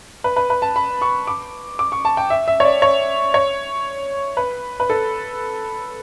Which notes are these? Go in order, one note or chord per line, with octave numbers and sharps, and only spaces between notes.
B4
B4
B4
A5
B5
C#6
D6
D6
C#6
A5
G5
E5
E5
C#5
D5
C#5
C#5
B4
B4
A4